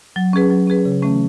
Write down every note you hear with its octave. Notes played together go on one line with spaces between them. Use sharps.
F#3
C#4 G#4 B4
F#3
C#4 G#4 B4
C#3
E3 A3 C#4